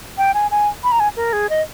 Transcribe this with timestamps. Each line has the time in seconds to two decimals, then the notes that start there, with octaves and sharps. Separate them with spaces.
0.18 G5
0.34 G#5
0.51 G#5
0.84 B5
0.92 A#5
1.00 G#5
1.16 A#4
1.33 G#4
1.49 D#5